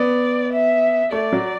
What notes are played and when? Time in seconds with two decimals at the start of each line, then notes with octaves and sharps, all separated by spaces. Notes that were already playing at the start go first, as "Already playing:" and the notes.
Already playing: B3 D5
0.53 E5
1.12 A3 D5
1.33 F#3